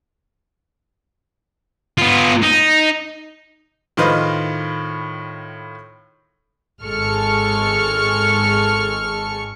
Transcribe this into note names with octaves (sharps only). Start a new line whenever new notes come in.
B3 F4
D#4
A2 D#3 F4 B4 C5 D#5
G#1 G#3 A4 C#6 F6 C#7